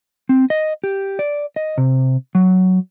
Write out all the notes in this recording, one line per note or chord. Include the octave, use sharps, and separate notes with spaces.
C4
D#5
G4
D5
D#5
C3
F#3